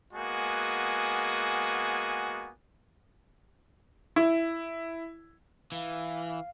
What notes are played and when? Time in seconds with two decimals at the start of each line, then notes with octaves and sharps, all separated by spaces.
0.14 G#3 A#3 B3 F#4 G#5
4.16 E4
5.72 E3 F5